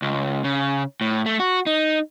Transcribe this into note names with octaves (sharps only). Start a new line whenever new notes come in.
C#2
C#3
A2
A3
F#4
D#4